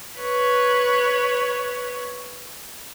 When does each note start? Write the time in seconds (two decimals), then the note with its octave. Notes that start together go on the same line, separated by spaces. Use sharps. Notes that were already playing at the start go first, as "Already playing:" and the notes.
0.19 B4 C#5